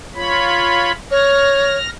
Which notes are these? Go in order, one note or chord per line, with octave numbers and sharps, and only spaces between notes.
F4 C#5 B5
C#5 F6 A#6